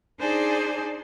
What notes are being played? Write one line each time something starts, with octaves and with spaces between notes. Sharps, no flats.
D4 D#4 G#4 C5 D5 G#5